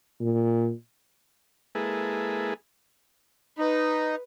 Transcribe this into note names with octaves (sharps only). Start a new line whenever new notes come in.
A#2
G#3 A#3 E4 G#4 A4 B4
D#4 B4